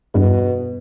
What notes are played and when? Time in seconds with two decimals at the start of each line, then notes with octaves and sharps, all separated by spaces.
0.14 E2 G2 B2